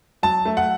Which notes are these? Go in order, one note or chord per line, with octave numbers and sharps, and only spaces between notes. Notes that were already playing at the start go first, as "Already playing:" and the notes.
F#3 A5
A3
F#5